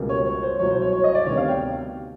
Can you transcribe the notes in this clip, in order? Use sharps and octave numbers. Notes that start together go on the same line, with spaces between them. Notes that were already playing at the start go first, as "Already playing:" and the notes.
Already playing: C#2 B2 G3 A#3
C#5
C#5
C5
C2 B2 F#3 C#5
C5
C#5
C#5
D#5
D5
D2 C3 D#3 G3 B3 C#5
F5
G5